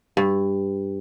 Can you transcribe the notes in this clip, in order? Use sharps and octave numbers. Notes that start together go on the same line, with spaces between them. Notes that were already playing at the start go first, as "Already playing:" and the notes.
G2